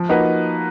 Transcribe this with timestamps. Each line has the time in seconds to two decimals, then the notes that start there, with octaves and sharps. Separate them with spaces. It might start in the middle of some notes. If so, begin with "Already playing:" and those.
Already playing: F3
0.09 A#3 D#4 F#4 B4